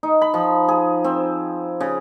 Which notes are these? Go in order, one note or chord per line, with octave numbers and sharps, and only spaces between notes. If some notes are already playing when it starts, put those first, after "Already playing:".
D#4
B5
F3
G#4
C4
C#3